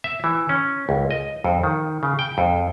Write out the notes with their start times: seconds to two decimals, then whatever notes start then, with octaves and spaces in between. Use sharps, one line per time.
0.04 E5
0.24 E3
0.49 C#4
0.89 C#2
1.11 D#5
1.44 F2
1.64 D#3
2.03 C#3
2.19 G5
2.38 F2